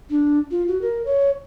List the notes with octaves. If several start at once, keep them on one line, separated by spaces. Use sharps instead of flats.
D4
F4
F#4
A#4
C#5